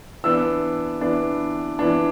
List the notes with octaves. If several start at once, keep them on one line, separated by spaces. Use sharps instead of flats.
E3 B3 D4 E6
E3 B3 D4
E3 B3 D4